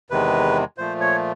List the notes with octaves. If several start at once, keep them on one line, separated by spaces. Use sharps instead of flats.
E2 C3 D#3 G#3 B4
A#2 F3 A3 C5
C#5